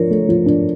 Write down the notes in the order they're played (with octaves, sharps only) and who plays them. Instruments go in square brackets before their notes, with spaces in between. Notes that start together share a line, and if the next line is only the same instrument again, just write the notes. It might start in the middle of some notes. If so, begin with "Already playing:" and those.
Already playing: [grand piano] F3 D4 [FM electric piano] A#4 C#5
[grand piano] A3
F3
D4